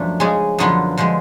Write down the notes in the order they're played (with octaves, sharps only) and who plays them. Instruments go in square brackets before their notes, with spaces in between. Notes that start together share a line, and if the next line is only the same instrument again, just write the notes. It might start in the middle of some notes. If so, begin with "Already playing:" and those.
Already playing: [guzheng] F#2 F3 A3 D4
C#3 G#3 C#4 G#4
F#2 D3 F3 B3 F4
D3 F3 G#3